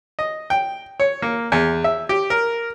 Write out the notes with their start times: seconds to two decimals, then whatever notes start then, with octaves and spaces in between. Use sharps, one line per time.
0.19 D#5
0.50 G5
1.00 C#5
1.22 A#3
1.52 E2
1.84 E5
2.09 G4
2.30 A#4